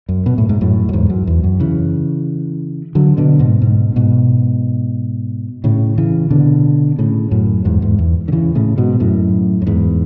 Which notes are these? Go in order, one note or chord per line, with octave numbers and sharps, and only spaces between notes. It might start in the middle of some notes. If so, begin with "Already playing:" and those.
F#2
B2
A2
G#2
F#2 A2
F#2
E2 G#2
F#2
E2
F#2
C#3 E3
D3 F#3
B2 D3
G#2 B2
G#2 B2
G#2 B2
A2 C#3
C#3 E3
B2 D3
A2 C#3
F#2 A2
E2 G#2
E2 G#2
E2
D3
C#3 E3
A2 C#3
G#2 B2
F#2 A2
F#2
E2 G#2